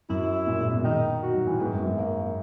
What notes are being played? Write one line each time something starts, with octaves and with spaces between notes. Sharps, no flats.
F#2 E4
A#2
G#2
B2
D#3 D#4
F#4
F#3
E3
G#2 B3
F#2
F#2
A#3